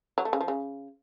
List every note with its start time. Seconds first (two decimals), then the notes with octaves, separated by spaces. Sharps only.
0.18 F#3
0.25 A3
0.33 C#3
0.41 F3
0.48 C#3